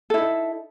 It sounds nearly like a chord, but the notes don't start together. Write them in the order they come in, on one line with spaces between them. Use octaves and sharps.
A4 E4 D#4